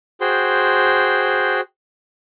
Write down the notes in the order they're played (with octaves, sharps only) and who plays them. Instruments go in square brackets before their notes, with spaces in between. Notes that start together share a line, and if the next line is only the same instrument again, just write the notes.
[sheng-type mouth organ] F#4 G#4 C5 G5 C6